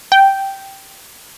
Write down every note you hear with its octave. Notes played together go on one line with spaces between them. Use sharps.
G5